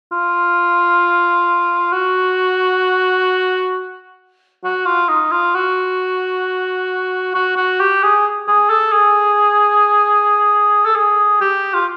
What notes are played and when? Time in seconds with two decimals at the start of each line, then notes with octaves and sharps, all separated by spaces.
0.12 F4
1.92 F#4
4.64 F#4
4.86 F4
5.09 D#4
5.32 F4
5.55 F#4
7.34 F#4
7.57 F#4
7.80 G4
8.03 G#4
8.48 G#4
8.70 A4
8.93 G#4
10.86 A4
10.96 G#4
11.41 G4
11.74 F4